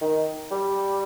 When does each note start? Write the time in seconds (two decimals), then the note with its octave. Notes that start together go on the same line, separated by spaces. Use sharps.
0.01 D#3
0.51 G3